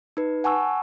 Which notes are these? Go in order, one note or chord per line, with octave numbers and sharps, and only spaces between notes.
D#4 B4
F#5 G#5 A5 C#6 E6